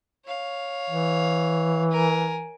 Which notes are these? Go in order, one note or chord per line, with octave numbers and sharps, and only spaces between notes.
C#5 F5
E3
A#4 G#5